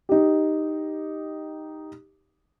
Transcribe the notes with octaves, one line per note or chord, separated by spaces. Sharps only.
D#4 G4